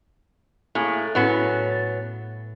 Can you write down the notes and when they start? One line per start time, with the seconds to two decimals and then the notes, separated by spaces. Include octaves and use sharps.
0.75 A2 A#3 G#4
0.89 F#6 A6
1.15 A2 F#3 B3 C#4
1.70 A6